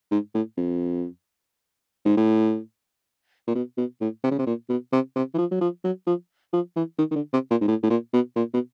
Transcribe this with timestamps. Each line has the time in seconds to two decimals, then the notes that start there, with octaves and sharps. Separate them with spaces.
0.11 G#2
0.34 A2
0.57 F2
2.05 G#2
2.17 A2
3.47 A#2
3.55 B2
3.77 B2
4.01 A2
4.24 C3
4.31 C#3
4.38 C3
4.46 A#2
4.69 B2
4.92 C3
5.16 C3
5.34 E3
5.38 F3
5.51 F#3
5.61 F3
5.84 F#3
6.07 F3
6.53 F3
6.76 E3
6.98 D#3
7.11 D#3
7.16 D3
7.33 C3
7.51 A#2
7.61 G#2
7.68 A2
7.83 A2
7.90 A#2
8.13 B2
8.36 A#2
8.53 B2